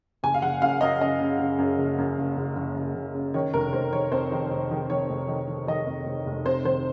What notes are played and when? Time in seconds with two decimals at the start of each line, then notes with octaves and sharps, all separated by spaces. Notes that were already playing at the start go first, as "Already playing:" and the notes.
0.23 F#1 G#5
0.34 F5
0.42 F#1 F#5
0.62 F#2 F5
0.81 F#2 D#5
1.01 C#3 D#5
1.20 C#3
1.39 C#3
1.59 F#2
1.78 F#1
1.98 F#2
2.18 F#1
2.37 F#1
2.56 F#1
2.76 F#1
2.95 F#1
3.15 C#3
3.34 D#3 C#5
3.54 F1 A#4
3.73 F1 C5
3.93 D#3 C#5
4.12 F2 C5
4.32 D#3
4.51 F1
4.71 D#3
4.90 D#3 C#5
5.10 F1
5.28 D#3
5.48 D#3
5.67 D#3 D#5
5.87 F2
6.06 F1
6.26 F1
6.45 C3 C5
6.64 D#3 C5